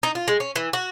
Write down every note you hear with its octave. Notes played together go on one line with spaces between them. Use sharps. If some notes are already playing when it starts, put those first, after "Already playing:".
D#4
F4
G#3
C#4
E3
F#4